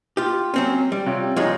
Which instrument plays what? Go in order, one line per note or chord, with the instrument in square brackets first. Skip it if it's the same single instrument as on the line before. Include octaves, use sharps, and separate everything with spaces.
[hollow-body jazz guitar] F4 G4
F#3 C4 C#4
G3
[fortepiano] C3 F4 C#5
[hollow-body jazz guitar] F3 G#3 [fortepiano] D#4 F4 C#5